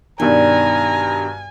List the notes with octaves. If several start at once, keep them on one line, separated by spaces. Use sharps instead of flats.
G2 B2 D#3 G3 G#5 A#5